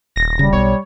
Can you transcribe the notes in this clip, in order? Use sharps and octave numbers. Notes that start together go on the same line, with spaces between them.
D#1 A#6
C#3 G3
B1 C#5